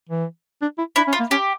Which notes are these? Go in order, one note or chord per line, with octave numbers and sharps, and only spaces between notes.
E3
D4
E4
D4 E4
C#4
F4
A#3
C#4 G4